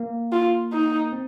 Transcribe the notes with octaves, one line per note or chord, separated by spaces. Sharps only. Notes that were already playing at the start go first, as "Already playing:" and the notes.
Already playing: A#3
F4
D#4
C4